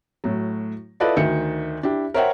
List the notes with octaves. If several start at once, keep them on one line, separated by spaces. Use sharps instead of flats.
A2 F#3
E4 F4 A4 B4 D5 D#5
D2 D#3 E5 C#7
D4 E4 G4
A#4 C5 C#5 E5 F#5 G5